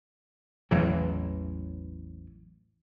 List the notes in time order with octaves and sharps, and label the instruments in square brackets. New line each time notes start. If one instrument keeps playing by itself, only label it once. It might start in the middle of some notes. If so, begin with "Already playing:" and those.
[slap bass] A1 E2 E3 F#3